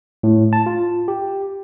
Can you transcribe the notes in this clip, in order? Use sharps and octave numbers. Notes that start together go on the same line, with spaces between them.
A2
A5
F4
G4